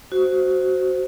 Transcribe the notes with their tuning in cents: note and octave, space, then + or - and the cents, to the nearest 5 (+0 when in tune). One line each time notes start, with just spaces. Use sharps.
F#4 +10 C5 +0